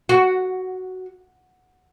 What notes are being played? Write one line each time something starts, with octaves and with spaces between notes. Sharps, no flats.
F#4